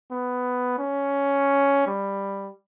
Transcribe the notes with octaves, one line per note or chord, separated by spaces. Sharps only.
B3
C#4
G3